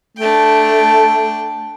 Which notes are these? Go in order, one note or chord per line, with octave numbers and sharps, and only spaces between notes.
A3 D4 G5